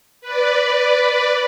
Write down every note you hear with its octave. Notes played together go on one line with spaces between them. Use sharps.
B4 D5